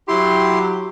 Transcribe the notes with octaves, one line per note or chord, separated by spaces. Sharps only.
F#3 E4 G4 C6